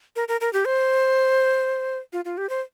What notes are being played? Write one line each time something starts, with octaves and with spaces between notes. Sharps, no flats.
A#4
A#4
A#4
G4
C5
F4
F4
G4
C5